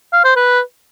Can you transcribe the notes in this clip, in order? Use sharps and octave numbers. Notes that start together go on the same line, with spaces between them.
F5
C5
B4